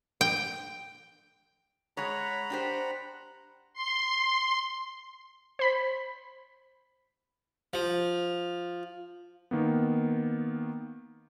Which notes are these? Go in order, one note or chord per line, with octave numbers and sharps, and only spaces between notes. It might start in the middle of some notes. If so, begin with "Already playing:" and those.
G5
G#3 C#5 F#5 A#5 B5
D4 G4 C5
C6
C5 B5 B6
F3
D#3 A#3 B3